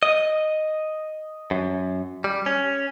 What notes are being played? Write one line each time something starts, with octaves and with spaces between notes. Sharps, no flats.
D#5
F#2
G3
C#4